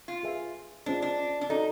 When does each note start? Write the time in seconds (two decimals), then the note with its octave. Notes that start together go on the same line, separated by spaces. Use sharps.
0.08 F4
0.23 G#4 B4 E5 G#5
0.86 C#4 D4 F4 G#4 C5 D#5
1.02 D4
1.41 D4
1.50 C#4 D#4 F#4 A4 D5